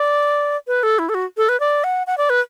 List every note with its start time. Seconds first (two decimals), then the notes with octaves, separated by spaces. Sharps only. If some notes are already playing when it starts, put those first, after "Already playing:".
Already playing: D5
0.67 B4
0.83 A4
0.99 E4
1.09 A4
1.14 F#4
1.37 A4
1.49 B4
1.60 D5
1.84 F#5
2.07 F#5
2.18 D5
2.30 B4